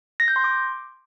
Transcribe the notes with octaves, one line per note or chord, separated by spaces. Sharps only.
A#6
G6
C6
D6